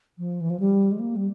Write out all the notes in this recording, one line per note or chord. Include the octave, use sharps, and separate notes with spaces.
F3
E3
F3
G3
G#3
A#3
G3